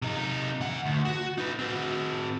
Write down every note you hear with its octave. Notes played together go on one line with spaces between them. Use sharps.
C3 D#4
E3 F#5
D2
F#4
D#4 B4
C4 F#4